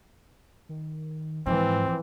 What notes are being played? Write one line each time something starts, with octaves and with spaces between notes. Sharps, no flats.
D#3
G#2 E3 F3 C4